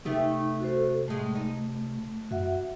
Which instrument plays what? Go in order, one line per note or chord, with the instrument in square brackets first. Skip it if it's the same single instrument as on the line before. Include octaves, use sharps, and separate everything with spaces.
[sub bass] C3 [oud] A3 B3 G4 [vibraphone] D#4
[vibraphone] F#4 A4 C5
[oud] A2 G#3 [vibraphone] A3
[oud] D#4
[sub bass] F#2 [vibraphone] F#4 E5 F#5